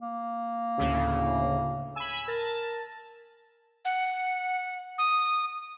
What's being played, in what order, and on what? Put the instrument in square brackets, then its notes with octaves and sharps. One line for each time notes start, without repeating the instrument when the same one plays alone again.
[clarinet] A#3
[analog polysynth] D2 A2 C#3
[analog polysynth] G#5 B5 [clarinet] E6
[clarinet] A#4 [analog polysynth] A5
[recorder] F#5
D#6